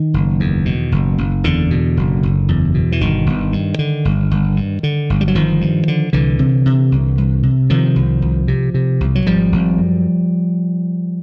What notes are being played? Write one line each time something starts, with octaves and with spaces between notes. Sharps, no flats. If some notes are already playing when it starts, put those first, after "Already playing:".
Already playing: D#3
F#1
E2
B2
F#1
F#1
E2 D3
B2
F#1
F#1
E2
B2
E3
G1 D#3
G1
G2
D3
G1
G1
G2
D3
G1
G3
F#3
G1 D#3 F3
G2
D3
C2 D3 E3
C3
C3
C2
C2
C3
C3 D#3 F3
C2
C2
C3
C3
C2
F#3
G#1 F3 G3
G#1
F#2